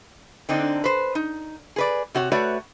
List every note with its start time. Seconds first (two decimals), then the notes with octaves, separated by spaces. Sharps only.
0.49 D3 C4 D4 D#4
0.84 B4 C5
1.15 D#4
1.76 G#4 B4 D5
2.15 C3 F#4 C#5
2.32 A3 F#4 B4 C#5 D5